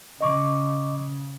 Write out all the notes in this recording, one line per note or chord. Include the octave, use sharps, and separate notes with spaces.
C#3 D#5 C#6 D6